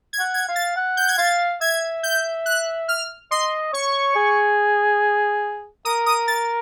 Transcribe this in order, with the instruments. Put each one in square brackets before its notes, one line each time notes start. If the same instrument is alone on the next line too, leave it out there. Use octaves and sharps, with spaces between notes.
[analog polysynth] G#6
[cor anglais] F#5
[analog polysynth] G#6
[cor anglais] F5
[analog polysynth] A6
[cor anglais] F#5
[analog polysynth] G6
G#6
[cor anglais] F5 [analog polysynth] A6
[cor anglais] E5 [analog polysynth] G#6
[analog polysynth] G6
F#6
F6
[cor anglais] D#5 [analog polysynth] C6
[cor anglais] C#5 [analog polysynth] C#6
[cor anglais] G#4
[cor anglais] A#4 [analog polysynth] D#6
[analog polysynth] D#6
A6